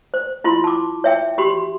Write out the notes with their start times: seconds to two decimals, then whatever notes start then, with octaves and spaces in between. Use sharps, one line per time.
0.14 C5
0.44 E4 F4 C6
0.64 A5 D6
1.04 C#5 E5 G5
1.38 F#4 G4 B5 C6